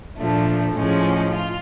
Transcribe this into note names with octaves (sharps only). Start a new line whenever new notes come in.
A#2 F3 A3 D4
A2 F3 G#3 C#4
F4